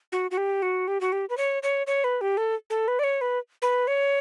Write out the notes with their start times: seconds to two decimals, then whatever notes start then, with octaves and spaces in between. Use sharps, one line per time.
0.12 F#4
0.31 F#4
0.37 G4
0.62 F#4
0.88 G4
1.01 F#4
1.12 G4
1.30 B4
1.37 C#5
1.63 C#5
1.87 C#5
2.04 B4
2.21 G4
2.37 A4
2.70 A4
2.88 B4
2.99 D5
3.04 C#5
3.21 B4
3.62 B4
3.87 C#5